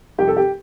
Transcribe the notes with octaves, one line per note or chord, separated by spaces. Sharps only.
F2 C3 G3 G4
A4
G4